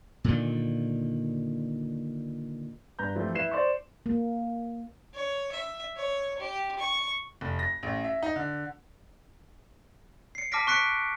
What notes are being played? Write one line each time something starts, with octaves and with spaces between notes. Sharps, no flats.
A#2 D3 D#3
G2 B4 A#5 G6
E3 F3 G3 A3 C4
E4 B4 C7 E7
C5 D5 C6 C#6
A#3
C#5
E5
C#5
G4
C#6
F1
A#6
A1
E5
D#4
D3
C7 C#7
A5 D6 F6 A#6 B6 D7
C#6 F#6 B6 C#7 D7